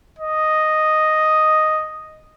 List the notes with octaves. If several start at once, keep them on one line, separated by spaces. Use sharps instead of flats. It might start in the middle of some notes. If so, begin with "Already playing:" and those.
D#5